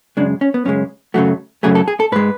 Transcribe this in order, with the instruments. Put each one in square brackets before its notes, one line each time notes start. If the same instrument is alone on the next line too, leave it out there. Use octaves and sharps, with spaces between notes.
[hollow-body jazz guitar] F#2 C#3 G#3 D4
C#4
B3
F#2 C#3 G#3 C#4
F#2 C#3 F#3 A3 F#4
F#2 C#3 F#3 A3 G#4
A4
G#4
A4
G#2 G#3 B4